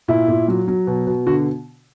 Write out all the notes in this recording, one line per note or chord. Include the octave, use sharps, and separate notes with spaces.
A#2 E4
A#2
F#3
F#3
B2
B2
D3 F#4